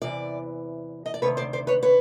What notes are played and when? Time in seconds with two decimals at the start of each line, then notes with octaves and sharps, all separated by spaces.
0.02 E2 C3 E3 D5
1.06 D#5
1.14 D5
1.22 D2 C3 D#3 B4 C#5
1.37 C5 D5
1.53 C5 D5
1.67 B4 C#5
1.83 B4 C#5